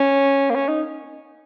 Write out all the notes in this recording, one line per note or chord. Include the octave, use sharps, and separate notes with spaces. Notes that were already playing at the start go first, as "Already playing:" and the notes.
Already playing: C#4
A#3
C#4
D#4